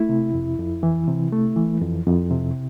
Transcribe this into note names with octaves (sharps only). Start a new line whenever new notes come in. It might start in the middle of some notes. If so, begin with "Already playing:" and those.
Already playing: A3 E4
C3
F2
F2
E3
C3
A3
E3
F2
F2
C3